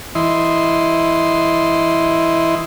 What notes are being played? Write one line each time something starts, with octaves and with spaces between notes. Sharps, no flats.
E3 E4 D#5 C6